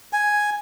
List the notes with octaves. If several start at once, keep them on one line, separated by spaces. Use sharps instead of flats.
G#5